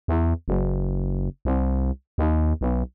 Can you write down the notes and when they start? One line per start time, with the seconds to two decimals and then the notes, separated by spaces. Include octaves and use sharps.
0.08 E2
0.48 F#1
1.45 C2
2.18 D#2
2.61 B1